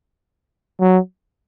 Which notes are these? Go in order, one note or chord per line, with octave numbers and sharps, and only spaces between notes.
F#3